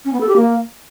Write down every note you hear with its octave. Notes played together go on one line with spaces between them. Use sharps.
C#4
B3
A4
G4
A#3